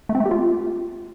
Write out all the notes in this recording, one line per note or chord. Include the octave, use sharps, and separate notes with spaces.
A3
C4
A3
G4
F4